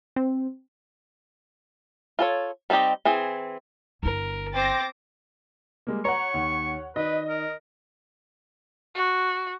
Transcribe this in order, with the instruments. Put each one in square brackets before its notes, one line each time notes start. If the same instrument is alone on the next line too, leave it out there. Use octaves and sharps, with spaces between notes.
[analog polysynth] C4
[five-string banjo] F4 A4 C#5
G3 C4 D#4 G4 D#5
E3 C4 G#4
[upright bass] G1 E4 [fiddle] A#4
[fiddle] C4 C5 [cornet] G5 [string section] D6 A6 A#6
[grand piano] G3 G#3 A#3
[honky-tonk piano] C#5 F#5 [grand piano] A#5 [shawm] C#6
[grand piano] D#2
[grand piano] D#3 D5 [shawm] B4 [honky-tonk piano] D#5
[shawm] A#4
[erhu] F#4